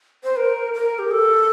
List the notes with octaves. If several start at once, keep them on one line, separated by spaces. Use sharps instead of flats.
C5
A#4
A#4
G4
A4